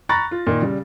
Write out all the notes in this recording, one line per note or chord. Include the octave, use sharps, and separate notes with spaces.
A#5 B5 C#6 F#6 A6 A#6
F4
A#2 D#3
C#3 G3